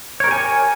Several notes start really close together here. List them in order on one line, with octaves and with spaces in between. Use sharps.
C#5 A#4 G4 G#5